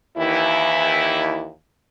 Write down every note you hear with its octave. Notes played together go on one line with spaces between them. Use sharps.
D#2 E3 E4